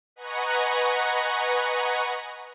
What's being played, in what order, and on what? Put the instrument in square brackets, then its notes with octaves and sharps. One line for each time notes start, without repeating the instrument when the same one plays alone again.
[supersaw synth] B4 D#5 F#5 G#5 A#5 C#6